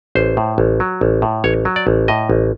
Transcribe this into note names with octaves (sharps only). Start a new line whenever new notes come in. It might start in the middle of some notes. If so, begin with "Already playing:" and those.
A1 C5
A2
A1
F#3
A1
A2
A1 C#5
F#3
D5
A1
A2 D#5
A1